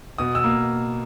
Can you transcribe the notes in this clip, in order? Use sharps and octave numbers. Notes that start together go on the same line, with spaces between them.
B2 D#6
E6
A#3